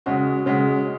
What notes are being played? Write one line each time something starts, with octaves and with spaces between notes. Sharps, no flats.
C#3 G#3 F#4
C#3 G#3 F#4